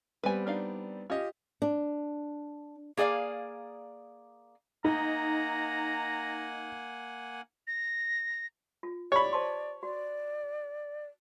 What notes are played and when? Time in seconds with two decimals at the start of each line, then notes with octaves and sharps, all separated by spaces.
0.23 G3 B3 C4 B4 G#5
0.47 D4 D#4 F5
1.10 C#4 F4 G4 D#5
1.62 D4
2.97 A#3 G#4 D5 D#5 F5
4.84 A#3 D#4 F#5 G#5 A#5
7.67 A#6
8.83 F4
9.12 G4 C#5 D5 B5
9.33 C5 A5 C6
9.83 F#4 D5